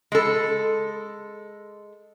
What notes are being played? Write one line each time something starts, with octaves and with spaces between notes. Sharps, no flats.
G#3 A4